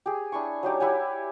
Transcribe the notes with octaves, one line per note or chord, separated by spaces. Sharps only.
G4 G#4
D4 E4 G#5 C#6
F#3 D#4 G4 D5
E4 G4 F#5 G#5